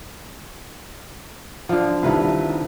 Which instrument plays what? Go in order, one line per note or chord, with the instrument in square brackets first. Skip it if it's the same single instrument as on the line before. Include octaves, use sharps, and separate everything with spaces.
[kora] D3 F3 [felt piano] F5
[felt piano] C2 D#3 E4 [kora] A4 B4 F5